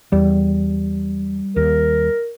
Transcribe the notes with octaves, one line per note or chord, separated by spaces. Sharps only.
E2 G3
D#2 A#4